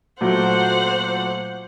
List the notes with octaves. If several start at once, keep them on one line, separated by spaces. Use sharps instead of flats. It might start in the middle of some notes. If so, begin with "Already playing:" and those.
A#2 F#3 A3 C5 F#5